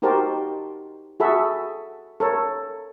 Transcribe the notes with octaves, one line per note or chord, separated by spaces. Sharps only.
D#4 F#4 G4 A#4 C5 A5
F#4 G#4 A4 E5 B5
A4 A#4 C#5